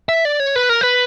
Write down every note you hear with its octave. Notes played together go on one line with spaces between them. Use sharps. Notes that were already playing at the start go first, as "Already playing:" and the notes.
E5
D5
C#5
B4
A#4
B4